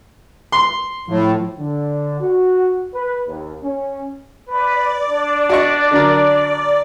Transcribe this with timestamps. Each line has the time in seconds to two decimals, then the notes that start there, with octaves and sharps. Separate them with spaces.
0.52 C6
1.07 A2 F3
1.58 D3
2.20 F#4
2.93 B4
3.27 D#2
3.63 C#4
4.47 B4 D5
5.08 D4
5.49 F#4 D#5 C#6
5.91 D3 F#3 A#4